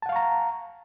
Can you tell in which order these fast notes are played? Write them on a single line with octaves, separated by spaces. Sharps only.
A5 F#5 F5 C#6 A#5